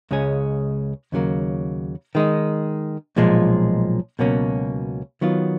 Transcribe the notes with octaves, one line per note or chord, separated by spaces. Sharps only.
C#2 C#3 G#3 C#4 G#4
D#2 C#3 F#3 A#3
D#3 G#3 D#4
B1 A#2 F3 G#3
C#2 B2 F#3 A#3 C#4
D#3 F#3 B3 F4